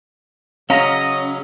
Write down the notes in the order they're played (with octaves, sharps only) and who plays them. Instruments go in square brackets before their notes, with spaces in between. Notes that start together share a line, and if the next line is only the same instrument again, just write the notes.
[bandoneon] C#3 F#3 [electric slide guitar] C#4 [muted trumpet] D#5 [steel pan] F5 A#5